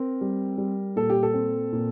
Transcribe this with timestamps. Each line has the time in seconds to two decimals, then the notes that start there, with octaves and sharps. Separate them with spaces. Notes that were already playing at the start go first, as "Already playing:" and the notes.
Already playing: C4 A#4
0.21 G3
0.58 G3
0.96 A#2 A4
1.10 G4
1.23 A4
1.34 C4
1.72 A#2